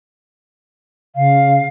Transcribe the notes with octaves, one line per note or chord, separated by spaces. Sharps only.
C#3 F5